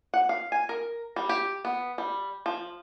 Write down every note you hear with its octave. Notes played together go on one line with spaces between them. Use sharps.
F#5
F5
G#5
A#4
G3
G4
B3
G3
F3